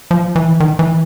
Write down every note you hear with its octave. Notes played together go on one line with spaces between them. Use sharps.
F3
E3
D#3
E3